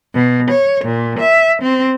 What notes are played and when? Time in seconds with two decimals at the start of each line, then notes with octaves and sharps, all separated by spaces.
0.15 B2
0.51 C#5
0.85 A#2
1.20 E5
1.62 C4